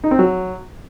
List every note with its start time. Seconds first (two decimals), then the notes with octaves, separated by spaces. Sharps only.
0.04 D#4
0.11 C4
0.19 F#3